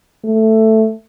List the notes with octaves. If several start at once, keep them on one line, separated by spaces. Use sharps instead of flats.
A3